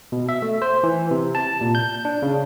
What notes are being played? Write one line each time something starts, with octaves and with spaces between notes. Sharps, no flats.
B2
E5
A3
C5
E3
C3
A5
A#2
G6
D4
C#3